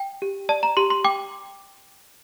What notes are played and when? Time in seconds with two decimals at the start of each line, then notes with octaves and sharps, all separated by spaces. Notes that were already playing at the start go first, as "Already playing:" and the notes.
Already playing: G5
0.22 G4
0.49 D5 A5
0.63 A#5
0.77 G4 C6
0.90 C6
1.04 G5 D6